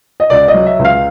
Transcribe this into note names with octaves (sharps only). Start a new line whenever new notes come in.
D#5
C#2 D5
D#5
F#3
E5
C#2
F5